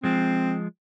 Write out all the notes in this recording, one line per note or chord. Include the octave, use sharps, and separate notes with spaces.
F3 G#3 C4